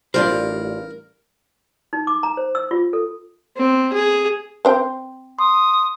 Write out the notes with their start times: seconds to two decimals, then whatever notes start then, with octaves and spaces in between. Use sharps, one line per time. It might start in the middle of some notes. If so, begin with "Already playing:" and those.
0.14 A1 G3 D4 F4 A#4 C5
1.93 D#4
2.07 D6
2.23 A#5
2.37 C5
2.55 E6
2.71 F4
2.93 A4
3.57 C4
3.93 G#4
4.65 C4 C5 G5
5.39 C6 D#6